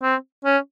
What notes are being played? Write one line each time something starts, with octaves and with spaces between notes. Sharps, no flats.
C4
C#4